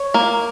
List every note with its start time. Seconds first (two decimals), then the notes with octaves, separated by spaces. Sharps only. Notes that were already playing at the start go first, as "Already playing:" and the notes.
Already playing: C#5
0.14 A#3